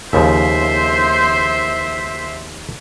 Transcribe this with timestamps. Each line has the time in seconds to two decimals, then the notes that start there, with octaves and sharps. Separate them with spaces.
0.13 D#2 C#3 F3 C5 E5